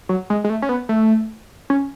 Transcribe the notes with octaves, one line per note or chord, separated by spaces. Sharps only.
F#3
G#3
G#3
A3
C#4
B3
A3
C#4